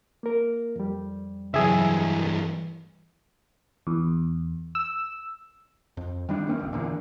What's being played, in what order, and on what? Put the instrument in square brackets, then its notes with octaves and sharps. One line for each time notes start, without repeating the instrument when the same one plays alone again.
[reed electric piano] A#3 A#4
F2 G3
[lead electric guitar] G2 E3 [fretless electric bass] C#3 F#3 [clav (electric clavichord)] G#4 E5
[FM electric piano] E2
E6
[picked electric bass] F2
D#3 G3 D4
D#3 A#3 C4 C#4
G1 C#2
E2 A#2 D3